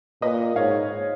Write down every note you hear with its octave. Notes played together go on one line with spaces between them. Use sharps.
A#2 B4 D#5
G#2 C#5 F5